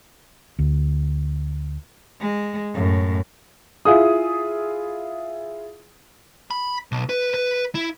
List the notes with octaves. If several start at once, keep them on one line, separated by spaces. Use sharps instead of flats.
D2
G#3
F#2 A2
E4 F4 G#4 D#6
B5
B1
B4
B4
E4